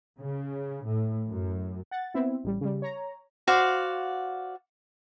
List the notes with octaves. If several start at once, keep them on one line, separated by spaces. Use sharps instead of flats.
C#3
A2
F#2
F#5 A6
B3 C4 E4
A1 G3
C#3 G3
C#5 A#5
F#4 C5 D5 F5